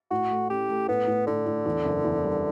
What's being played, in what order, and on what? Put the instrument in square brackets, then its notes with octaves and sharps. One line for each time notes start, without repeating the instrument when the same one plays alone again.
[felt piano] A2 [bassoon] F#4
[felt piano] A3
[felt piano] C#4 [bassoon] G4
[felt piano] A3
[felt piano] A2 [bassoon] B3
[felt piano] A2
[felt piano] A2 [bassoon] D3
[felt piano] A2
E2
F#1
E2
G3